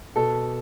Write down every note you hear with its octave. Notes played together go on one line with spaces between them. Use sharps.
B2 A4